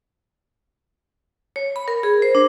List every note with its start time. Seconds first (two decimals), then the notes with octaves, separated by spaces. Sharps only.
1.56 C#5
1.76 B5
1.88 A#4
2.03 G#4
2.22 C5
2.35 D4